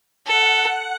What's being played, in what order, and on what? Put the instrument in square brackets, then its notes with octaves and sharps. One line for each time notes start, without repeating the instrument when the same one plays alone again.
[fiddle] A4 [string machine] F#5